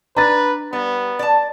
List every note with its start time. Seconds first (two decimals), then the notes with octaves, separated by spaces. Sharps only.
0.16 D4 B4 A#5 A6
0.73 G3 B3
1.19 D5 A5